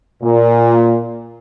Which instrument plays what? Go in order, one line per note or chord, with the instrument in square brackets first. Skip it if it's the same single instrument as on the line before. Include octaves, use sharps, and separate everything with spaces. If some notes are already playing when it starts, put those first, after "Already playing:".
[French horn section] A#2